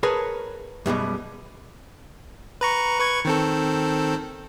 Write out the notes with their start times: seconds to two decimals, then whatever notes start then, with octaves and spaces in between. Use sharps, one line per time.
0.03 G#4 A#4 B4 C#5 A5
0.86 F#2 B2 G3 G#3
2.61 B4 A#5 C#6
2.99 B4 C#6 G#6
3.25 D#3 C4 A4